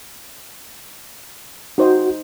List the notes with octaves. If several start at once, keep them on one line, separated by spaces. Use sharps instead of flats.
D#4 F#4 C5 D#5